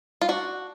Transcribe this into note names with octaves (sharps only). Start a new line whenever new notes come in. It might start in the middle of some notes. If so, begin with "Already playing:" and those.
F4
D4 F#4